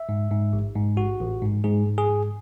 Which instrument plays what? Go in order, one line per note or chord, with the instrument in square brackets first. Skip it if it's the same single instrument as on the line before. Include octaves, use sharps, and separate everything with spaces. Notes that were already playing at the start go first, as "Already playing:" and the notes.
Already playing: [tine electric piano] E5
G#2
G#2
A1
G#2
A1 F#4
A1
G#2
G#2 G#4
G#2
G#4
G#2